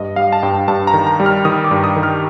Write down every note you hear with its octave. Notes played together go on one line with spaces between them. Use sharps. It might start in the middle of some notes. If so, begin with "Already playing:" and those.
Already playing: G2 D#5
G3 F5
A5
G2 G5
G2 A5
A#5
D#3
A#5
G3
F6
D#3 D#6
D6
G2
D#6
D#3
F6